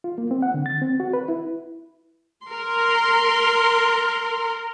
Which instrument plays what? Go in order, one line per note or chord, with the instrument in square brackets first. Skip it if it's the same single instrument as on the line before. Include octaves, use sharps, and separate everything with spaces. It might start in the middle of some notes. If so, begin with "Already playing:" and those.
[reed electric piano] F4
A#3
C4
F#5
D3
A6
C4
F#4
B4
E4
[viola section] A#4 C6